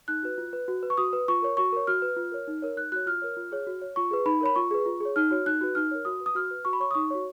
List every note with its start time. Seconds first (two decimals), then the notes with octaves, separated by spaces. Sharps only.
0.08 D#4 F#6
0.23 F#4 B4
0.38 F4
0.53 B4
0.68 F#4
0.83 B4
0.90 C#6
0.97 F#4 D#6
1.13 B4
1.28 F4 C#6
1.42 A#4 C#5
1.57 F#4 C#6
1.72 A#4 C#5
1.87 F#4 F6
2.02 B4
2.17 F4
2.32 A#4 C#5
2.48 D#4
2.62 A#4 C#5
2.76 D#4 F#6
2.92 F#4 C#5 F#6
3.06 F4 F6
3.22 A#4 C#5
3.37 F4
3.52 G#4 C#5
3.67 F#4
3.82 C#5
3.96 F4 C#6
4.11 G#4 B4
4.26 D#4 B5
4.41 A#4 C#5 B5
4.56 F4 C#6
4.71 G#4 B4
4.86 F4
5.00 G#4 C#5
5.16 D#4 F6
5.31 F#4 C#5
5.46 D#4 F#6
5.61 F#4 B4
5.75 D#4 F6
5.91 A#4 C#5
6.05 F#4 D#6
6.20 B4
6.26 D#6
6.35 F#4 F6
6.51 B4
6.65 F#4 C#6
6.73 B5
6.80 C#5 C#6
6.91 D#6
6.94 D#4 C#6
7.11 F#4 C#5